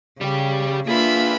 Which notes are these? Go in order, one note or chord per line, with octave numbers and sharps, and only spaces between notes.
C#3 G3 G4
A#3 D4 F4 G#4 B4 E5 B5